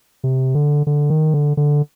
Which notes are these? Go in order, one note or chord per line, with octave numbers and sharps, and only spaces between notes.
C3
D3
D3
D#3
D3
D3